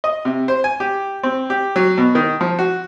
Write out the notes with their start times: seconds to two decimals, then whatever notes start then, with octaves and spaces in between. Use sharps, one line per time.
0.04 D#5
0.25 C3
0.48 C5
0.64 G#5
0.80 G4
1.23 C4
1.50 G4
1.76 F#3
1.98 B2
2.15 D#3
2.41 F3
2.59 F#4